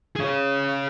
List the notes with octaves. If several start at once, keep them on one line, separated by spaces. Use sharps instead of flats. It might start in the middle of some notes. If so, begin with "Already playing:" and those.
G#4 C#5